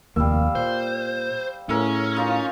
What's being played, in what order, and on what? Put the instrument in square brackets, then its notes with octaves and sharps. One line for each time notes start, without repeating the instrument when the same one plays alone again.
[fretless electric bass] F1 D#2 A#3 [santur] G3 F5 E6
[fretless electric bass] A#2 [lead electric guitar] C5
[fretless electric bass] A2 [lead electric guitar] C#4 [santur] G#4 A#4 E5
[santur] D#4 F4 F5